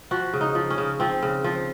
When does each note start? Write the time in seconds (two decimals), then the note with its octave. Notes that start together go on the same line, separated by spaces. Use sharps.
0.11 F3 F#4
0.33 C#3
0.41 D#4
0.55 F3
0.70 C#4
0.78 C#3
1.00 F3 C4
1.22 C#3
1.44 F3